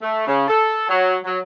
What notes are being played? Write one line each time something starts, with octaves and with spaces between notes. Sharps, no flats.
A3
C#3
A4
F#3
F#3